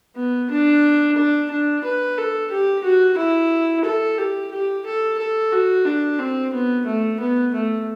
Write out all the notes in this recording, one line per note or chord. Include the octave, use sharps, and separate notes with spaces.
B3
D4
D4
D4
B4
A4
G4
F#4
E4
A4
G4
G4
A4
A4
F#4
D4
C4
B3
A3
B3
A3